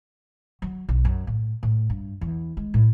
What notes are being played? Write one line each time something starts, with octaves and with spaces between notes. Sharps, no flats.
F#3
B1
F#2
A2
A2
G2
E2
G#3
A2